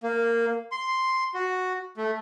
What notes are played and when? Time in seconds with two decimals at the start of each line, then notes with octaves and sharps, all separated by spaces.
0.03 A#3
0.72 C6
1.34 F#4
1.97 A3